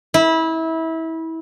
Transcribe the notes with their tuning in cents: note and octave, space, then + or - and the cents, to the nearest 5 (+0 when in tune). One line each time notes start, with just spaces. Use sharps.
E4 -25